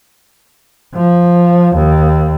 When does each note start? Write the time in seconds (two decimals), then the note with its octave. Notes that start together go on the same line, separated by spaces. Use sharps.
0.95 F3
1.75 D#2